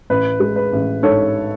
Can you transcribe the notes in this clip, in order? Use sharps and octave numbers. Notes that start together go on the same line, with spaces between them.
A1 B4
G#3
B4
A1
G#2 A4 C#5